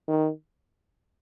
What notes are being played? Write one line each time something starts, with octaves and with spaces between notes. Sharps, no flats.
D#3